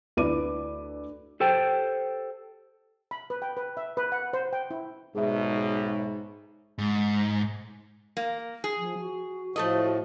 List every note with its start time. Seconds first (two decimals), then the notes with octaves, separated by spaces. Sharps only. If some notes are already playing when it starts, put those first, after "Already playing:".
0.17 D2 E4 B4 D5 D6 D#7
1.40 G4 A4 C5 G5
3.11 B5
3.30 B4
3.42 G5
3.57 B4
3.77 E5
3.97 B4
4.12 F#5
4.33 C5
4.53 G5
4.71 E4
5.15 B1 G#2 B2 G#4 E5
6.78 G#2
8.17 A#3
8.64 G#4
8.79 F3
8.99 F#4
9.56 A2 F3 A3 A4 D#5